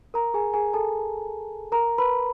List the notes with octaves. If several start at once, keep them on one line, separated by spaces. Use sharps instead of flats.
A#4 A#5
G#4 G#5
G#4 G#5
A4 A5
A#4 A#5
B4 B5